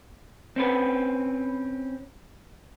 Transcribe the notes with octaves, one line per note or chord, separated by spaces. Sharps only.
C4 C#4 B4